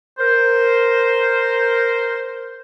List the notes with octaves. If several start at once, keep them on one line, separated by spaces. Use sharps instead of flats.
A#4 C5